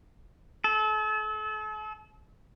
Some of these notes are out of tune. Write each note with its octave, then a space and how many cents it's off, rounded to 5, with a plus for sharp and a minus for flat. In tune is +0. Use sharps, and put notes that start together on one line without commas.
A4 -40